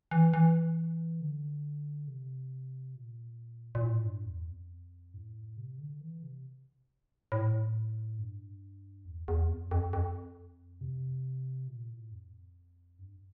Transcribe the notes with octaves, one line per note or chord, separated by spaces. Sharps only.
E3
E3
D3
C3
A#2
A#2
A2
G2
E2
F2
A2
C3
D3
E3
C3
A2
G2
E2
E2
F2
F2
F2
C3
A#2
A2
F2
G2